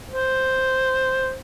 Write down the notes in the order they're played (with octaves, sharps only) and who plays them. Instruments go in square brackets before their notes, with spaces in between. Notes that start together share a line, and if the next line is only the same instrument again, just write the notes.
[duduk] C5